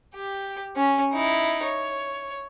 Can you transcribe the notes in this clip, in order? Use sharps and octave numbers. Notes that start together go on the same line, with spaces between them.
G4
C#4
D#4 E4
C#5